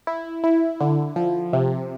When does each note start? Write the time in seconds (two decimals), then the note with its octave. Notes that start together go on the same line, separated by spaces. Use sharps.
0.07 E4
0.44 E4
0.81 D3
1.16 F3
1.53 C3